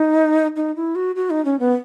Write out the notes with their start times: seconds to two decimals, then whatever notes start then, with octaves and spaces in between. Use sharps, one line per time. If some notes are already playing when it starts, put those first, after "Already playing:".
Already playing: D#4
0.56 D#4
0.76 E4
0.95 F#4
1.16 F#4
1.30 D#4
1.45 C#4
1.60 B3